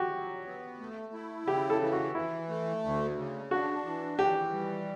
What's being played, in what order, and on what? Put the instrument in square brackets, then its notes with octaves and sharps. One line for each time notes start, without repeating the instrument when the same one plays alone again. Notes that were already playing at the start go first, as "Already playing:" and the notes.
Already playing: [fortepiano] F#4 G4
[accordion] F#3
B3
A3
E4
[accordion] C#3 [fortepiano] G4
[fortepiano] A4
[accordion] E3
[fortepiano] F#4
[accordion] E3 [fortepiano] E4
[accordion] A3
D2
C#3
[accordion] D4 [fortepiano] F#4
[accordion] E3
[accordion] E3 [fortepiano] G4
[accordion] G3